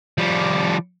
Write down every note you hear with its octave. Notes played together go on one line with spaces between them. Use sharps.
F3 G3